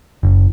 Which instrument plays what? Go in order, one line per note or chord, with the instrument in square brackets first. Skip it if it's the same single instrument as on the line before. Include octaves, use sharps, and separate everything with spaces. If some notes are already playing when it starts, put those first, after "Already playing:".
[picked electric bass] F#1